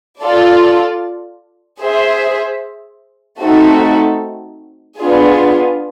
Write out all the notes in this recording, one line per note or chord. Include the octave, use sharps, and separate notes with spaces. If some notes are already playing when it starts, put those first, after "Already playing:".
F4 A4 D5
G#4 C5 E5
A3 C4 D#4 F#4 A4
B3 D4 F4 G#4